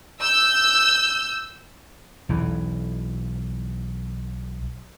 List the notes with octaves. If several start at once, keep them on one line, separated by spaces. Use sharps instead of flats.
E6 G6
B1 E3